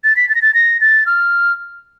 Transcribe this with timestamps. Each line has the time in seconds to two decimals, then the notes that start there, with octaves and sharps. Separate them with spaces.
0.04 A6
0.16 B6
0.29 A6
0.35 A#6
0.42 A6
0.54 A#6
0.81 A6
1.06 F6